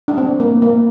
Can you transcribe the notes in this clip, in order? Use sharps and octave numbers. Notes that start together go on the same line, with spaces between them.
D4
C4
A#3
A#3